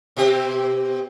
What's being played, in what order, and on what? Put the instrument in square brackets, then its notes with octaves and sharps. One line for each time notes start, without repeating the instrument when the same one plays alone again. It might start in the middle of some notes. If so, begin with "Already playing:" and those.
[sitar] B2 C4 G4